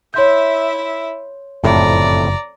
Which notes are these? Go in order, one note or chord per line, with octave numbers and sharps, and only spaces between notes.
E4 C#5 E5 C6 G6
F#1 F2 A2 C3 D5 A#5